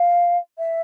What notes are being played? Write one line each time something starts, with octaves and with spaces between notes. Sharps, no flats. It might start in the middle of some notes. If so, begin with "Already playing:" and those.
Already playing: F5
E5